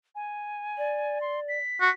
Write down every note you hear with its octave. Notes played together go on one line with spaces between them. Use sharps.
G#5
D5
C6
B6
F#4